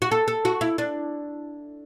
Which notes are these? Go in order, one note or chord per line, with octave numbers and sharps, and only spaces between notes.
F#4
A4
A4
F#4
E4
D4